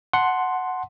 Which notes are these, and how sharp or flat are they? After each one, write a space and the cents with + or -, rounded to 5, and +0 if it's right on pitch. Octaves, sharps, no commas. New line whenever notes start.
F#5 +0 A5 -10 C6 +0